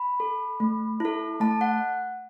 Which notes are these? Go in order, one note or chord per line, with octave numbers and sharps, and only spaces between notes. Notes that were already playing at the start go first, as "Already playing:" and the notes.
Already playing: B5
A4
A3
E4 A4
A3 A5
F#5